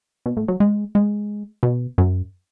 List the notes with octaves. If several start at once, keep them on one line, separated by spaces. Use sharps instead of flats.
B2
A2
F#3
G#3
G#3
B2
F#2